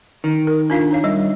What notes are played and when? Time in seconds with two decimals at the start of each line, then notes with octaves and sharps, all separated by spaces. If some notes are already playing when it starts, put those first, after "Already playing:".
0.24 D#3
0.47 A#4
0.70 D4 F4 F5
0.91 D#4 C#5 F5
1.04 G3 E5